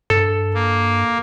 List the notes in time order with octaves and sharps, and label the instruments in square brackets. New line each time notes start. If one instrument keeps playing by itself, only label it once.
[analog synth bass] G2 [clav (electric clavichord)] A4
[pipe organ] A#3